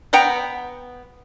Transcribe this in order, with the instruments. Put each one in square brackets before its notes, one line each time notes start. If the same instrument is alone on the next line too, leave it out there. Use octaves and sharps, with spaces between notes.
[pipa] B3 F#5 G5 A#5